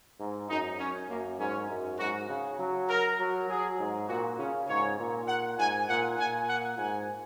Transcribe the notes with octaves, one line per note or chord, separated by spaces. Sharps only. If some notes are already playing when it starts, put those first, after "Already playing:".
G#2
F#2 D#4
C#4
F#2 A#3
G#2 C#4
F#2
G#2 F#4
C#3
F#3
A#4
F#3
F#3 G#4
G#2
A#2 F#4
C#3 C#4
G#2 C#5
A#2
F#5
G#2 G#5
A#2 F#5
A#2 G#5
F#5
G#2 G#5